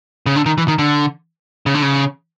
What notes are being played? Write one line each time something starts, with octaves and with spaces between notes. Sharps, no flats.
C#3
D3
D#3
E3
D#3
D3
C#3
D3
C#3